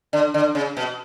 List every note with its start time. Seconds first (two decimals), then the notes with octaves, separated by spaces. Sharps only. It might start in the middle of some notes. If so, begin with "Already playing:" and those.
0.13 D3
0.34 D3
0.55 C#3
0.77 B2